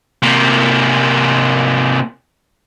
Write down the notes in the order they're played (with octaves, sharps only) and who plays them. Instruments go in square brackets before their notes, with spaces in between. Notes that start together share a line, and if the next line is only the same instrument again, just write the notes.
[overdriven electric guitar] C3 A#3